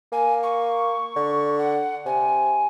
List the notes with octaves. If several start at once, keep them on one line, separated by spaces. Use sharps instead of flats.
A#3 G#5
C#6
D3
F#5
C3 G#5